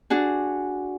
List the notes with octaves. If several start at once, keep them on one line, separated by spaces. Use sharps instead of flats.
D4 F#4 G#4